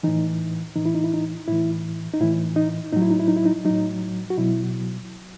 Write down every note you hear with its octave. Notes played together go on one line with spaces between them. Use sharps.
A2 E3 D#4
A2 E3 D#4
E4
D#4
E4
D#4
A2 E3 E4
D#4
A2 E3 E4
D#4
A2 F#3 D#4
E4
D#4
E4
D#4
E4
D#4
A2 F#3 D#4
F#4
B2 F#3 E4